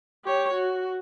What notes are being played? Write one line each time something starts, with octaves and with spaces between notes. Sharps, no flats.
G4 C#5
F#4